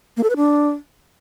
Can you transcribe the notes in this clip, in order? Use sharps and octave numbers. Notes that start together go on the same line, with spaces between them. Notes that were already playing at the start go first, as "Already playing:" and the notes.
A#3
A4
B4
D4